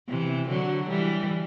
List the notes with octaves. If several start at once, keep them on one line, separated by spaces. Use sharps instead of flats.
C3 E3
D3 F#3
E3 G3